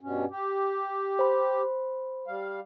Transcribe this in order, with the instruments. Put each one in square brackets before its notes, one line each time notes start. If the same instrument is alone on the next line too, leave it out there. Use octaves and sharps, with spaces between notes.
[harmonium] G2 B2 C#4
G4
[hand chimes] C5 B5
[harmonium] G3 F5